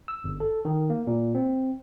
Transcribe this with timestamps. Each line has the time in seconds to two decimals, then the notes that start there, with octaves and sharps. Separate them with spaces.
0.08 E6
0.24 G1
0.40 A4
0.65 D#3
0.90 A#3
1.07 A#2
1.35 C4